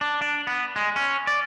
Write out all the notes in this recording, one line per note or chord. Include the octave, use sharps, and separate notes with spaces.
D4
D4
B3
G#3
C#4
D5